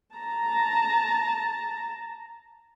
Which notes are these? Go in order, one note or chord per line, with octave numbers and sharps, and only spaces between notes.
A5 A#5